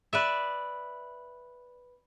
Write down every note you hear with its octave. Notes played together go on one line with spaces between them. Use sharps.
B4 D5 E5